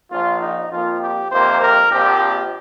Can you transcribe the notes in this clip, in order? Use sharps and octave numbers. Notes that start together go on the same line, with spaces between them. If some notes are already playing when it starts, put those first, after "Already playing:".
A#1 A#2 F3 F4
D#4
F2 F3 A#3 F4
G4
F2 C3 D#3 A#3 C5
A#4
A#1 A#2 F3 C4 G4